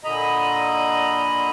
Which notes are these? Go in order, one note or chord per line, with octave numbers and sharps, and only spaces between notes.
A#2 D3 D#5 A#5 B5